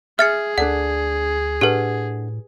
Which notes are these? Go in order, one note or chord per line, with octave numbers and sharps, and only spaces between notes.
G#4 E5 F6 A6 C#7
D2 D4 A4 D5 F#5
A2 D4 G4 A4 B4 F#5